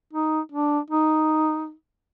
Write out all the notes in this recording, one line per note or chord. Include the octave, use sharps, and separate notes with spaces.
D#4
D4
D#4